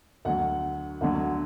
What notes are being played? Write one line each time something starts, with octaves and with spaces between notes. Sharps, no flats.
D2 D3 F#3 F#5
D2 D3 F#3